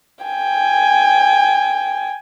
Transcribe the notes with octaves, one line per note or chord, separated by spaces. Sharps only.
G5 G#5